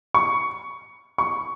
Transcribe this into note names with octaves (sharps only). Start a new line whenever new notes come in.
C#6
C#6